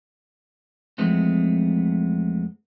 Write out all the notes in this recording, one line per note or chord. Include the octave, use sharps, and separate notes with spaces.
F2 E3 G#3 A3 B3 C4